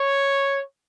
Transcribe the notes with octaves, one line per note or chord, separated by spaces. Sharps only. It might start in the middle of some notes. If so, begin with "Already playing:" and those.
Already playing: C#5